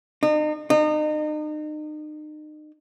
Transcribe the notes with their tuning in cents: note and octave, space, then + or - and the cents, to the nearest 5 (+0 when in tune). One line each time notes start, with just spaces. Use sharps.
D#4 -40
D#4 -35